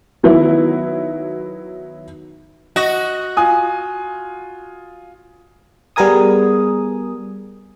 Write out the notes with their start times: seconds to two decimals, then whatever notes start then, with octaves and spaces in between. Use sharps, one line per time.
0.23 D#3 F#3 B3 E4
2.76 F#4 D#5
3.37 F4 G#5 D#6
5.96 G3 B3 G#4 A#4 G#5 D#6